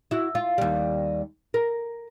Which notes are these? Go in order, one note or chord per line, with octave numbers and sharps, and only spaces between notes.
E4 F#4
F4
D#2 G3
A#4